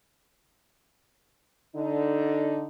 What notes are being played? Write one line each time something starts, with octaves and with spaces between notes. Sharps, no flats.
D3 D#4